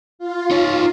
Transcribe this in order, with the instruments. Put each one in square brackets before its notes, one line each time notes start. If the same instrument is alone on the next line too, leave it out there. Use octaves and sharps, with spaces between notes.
[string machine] F4
[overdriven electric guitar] D#4 C#5